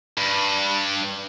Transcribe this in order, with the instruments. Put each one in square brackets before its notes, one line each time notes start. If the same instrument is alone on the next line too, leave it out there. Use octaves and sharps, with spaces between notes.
[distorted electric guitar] G2